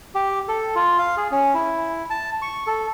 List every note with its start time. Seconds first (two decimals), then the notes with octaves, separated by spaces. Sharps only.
0.15 G4
0.48 A4
0.75 F4
0.98 F5
1.17 G#4
1.31 C#4
1.54 E4
2.10 A5
2.42 C#6
2.67 A4